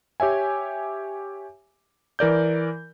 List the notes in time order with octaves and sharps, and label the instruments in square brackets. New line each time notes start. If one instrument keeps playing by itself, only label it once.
[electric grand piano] G4 C#5 E5 G#5
E3 A#4 D5 G6